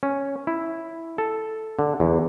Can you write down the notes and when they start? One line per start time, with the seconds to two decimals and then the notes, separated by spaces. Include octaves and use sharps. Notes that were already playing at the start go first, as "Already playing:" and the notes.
0.03 C#4
0.47 E4
1.18 A4
1.79 D3
2.00 E2